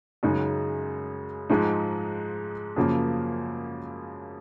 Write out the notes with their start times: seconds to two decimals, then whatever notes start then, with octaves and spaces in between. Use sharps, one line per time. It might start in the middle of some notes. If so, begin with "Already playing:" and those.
0.23 F#2 C#3 G#3 D#4
1.50 G#2 F3 G#3 D#4
2.76 F#2 C#3 F3 A#3